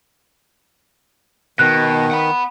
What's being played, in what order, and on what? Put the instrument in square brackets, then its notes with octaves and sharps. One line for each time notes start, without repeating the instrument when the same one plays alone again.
[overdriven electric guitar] B2 [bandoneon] D#3 [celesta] F#6
[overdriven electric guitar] F#5 B5